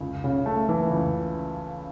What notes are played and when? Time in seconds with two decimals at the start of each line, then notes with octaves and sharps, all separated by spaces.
0.01 C#2
0.24 C#3
0.46 A3
0.69 E3
0.91 C#2